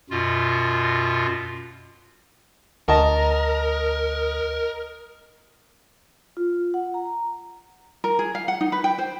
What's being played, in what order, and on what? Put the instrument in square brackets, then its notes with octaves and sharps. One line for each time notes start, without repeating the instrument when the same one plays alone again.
[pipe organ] F#2 B2 F4
[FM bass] D2 [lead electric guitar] A#4 [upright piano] D#5 A5
[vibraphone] F4
F#5
A#5
[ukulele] A#4
G#4
F5
F#5
D#4
B4
G5
C5